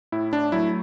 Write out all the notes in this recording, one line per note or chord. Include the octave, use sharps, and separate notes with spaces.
A2 E4
D4
F#3 A3 E4